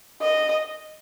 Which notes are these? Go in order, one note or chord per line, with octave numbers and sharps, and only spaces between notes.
D#5